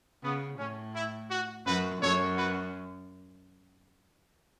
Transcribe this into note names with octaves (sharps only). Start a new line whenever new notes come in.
C#3 B3
A2 C#4
E4
F#4
F#2 F#4 B4
F#2 A4 C#5
F#4 B4